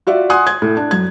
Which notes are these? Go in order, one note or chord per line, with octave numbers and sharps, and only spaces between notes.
F4 F#4 D5 E5
F#5 G#5 C6 D#6 F#6
G#6
A2
D4
F#2 G#6